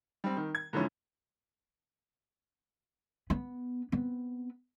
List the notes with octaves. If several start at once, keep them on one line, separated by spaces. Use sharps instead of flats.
G3 C4
D#3
G#6
G#2 D3 E3 F3 C#4
B3
B3 C4